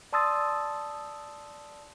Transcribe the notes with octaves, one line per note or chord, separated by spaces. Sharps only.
D5 A5 C6 D#6 E6 A6